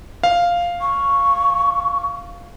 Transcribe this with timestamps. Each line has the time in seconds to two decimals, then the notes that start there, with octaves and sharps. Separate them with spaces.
0.23 F5
0.81 C#6